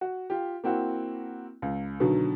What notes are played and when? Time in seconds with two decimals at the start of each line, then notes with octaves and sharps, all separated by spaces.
0.01 F#4
0.30 F4 G4
0.64 A#3 C4 E4 F#4
1.62 C#2
2.00 B2 D3 D#3 F#3